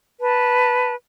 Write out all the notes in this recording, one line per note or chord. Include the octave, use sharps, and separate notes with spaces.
B4 A5